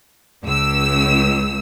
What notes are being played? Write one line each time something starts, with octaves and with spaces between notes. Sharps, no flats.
C#2 E6